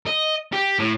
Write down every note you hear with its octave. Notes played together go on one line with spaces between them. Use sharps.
D#5
G4
A2